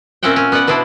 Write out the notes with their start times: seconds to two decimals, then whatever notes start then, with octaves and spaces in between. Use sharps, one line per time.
0.23 A#2 C4 C#4 E5 F#5 G5
0.36 C#4
0.52 B3 B4 D5 F#5
0.67 B2 B3 D4 E4 C5